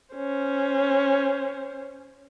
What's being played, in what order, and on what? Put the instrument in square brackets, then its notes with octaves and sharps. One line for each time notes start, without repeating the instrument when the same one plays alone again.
[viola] C#4 C5